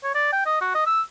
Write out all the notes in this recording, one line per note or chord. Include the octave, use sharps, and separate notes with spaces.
C#5
D5
G5
D#5
F#4
D#5
E6